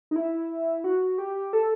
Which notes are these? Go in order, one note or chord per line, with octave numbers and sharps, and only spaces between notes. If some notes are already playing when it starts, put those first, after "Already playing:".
D#4
E4
F#4
G4
A4